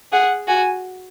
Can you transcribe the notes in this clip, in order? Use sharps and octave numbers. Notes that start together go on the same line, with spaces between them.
G#4 F#5
F#4 G#5